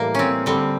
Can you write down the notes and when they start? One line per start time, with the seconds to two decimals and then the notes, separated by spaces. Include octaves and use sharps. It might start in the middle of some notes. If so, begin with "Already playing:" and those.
Already playing: A2 E3 G3 A#3
0.15 C4 C#4
0.46 D3 G3 C4